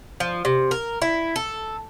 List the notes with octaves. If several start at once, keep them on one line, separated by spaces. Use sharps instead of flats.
F3
C3
A#4
E4
A4